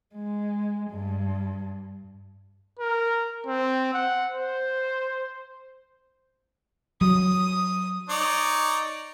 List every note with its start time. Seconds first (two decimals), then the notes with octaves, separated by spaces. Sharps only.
0.15 G#3
0.90 G2
2.79 A#4
3.46 C4
3.93 F#5
4.32 C5
7.01 F#3 D#6
8.09 D#4 C#5 D5